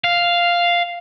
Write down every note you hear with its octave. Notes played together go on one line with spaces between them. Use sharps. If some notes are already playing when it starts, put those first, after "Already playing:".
F5